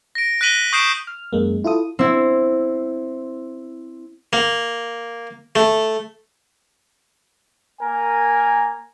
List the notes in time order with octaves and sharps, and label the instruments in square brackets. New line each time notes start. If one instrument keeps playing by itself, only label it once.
[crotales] A#6 D7
F#6 A#6 B6 D#7 F#7 G7
C#6 D#6 G6 C7 D7 E7
[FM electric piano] F6
F#2 G#3 A#3
E4 F4 A4 D#6
[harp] C4 E4
[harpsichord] A#3
A3
[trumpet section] A#3 A#4 G#5